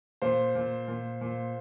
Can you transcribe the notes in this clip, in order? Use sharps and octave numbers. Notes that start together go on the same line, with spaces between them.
A#2 C5
A#2
A#2
A#2